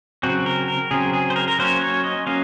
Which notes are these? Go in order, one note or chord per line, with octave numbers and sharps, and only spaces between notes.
C#3 F#3 C4 F#4
A#4
A#4
C#3 F#3 C4 G#4
G#4
C5
A#4
A#4
F#3 A#3 C#4 C5
C#5
D#5
F#3 A#3 C#4 F5